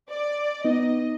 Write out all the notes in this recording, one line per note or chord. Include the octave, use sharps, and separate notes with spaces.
D5
B3 D#4 D#5